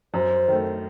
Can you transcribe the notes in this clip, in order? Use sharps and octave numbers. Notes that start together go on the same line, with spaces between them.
F#2 C5
D#3 A3